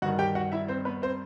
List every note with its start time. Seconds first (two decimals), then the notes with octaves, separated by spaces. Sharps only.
0.02 G2 F#4 F#5
0.06 D#3
0.19 G4 G5
0.35 F#4 F#5
0.52 E4 E5
0.68 C4 C5
0.85 B3 B4
1.02 C4 C5